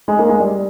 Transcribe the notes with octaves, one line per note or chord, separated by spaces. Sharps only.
G#3
A#3
G#3
G3